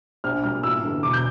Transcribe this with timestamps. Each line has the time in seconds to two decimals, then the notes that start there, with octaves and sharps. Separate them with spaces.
0.24 A#1 F6
0.44 A#2 G3 F6
0.63 A1 E6
0.83 G2 D3
1.03 E1 D6
1.13 G6